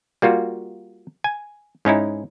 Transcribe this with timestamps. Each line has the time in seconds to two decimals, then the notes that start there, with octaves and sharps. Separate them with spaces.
0.22 G3 A#3 F4 F#4
1.24 G#5
1.85 G#2 C#4 D#4 E4